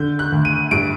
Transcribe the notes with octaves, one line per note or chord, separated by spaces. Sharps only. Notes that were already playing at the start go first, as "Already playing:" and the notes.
Already playing: D3 G6
F#6
D2
D#7
G2 D7